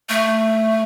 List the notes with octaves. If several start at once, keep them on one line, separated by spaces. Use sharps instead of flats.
A3